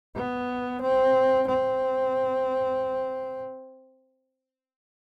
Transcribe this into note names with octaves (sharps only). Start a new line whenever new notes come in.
B3
C4
C4